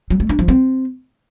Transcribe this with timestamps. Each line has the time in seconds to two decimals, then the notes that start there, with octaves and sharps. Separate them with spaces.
0.10 F#3
0.20 A3
0.29 D4
0.39 F3
0.48 C4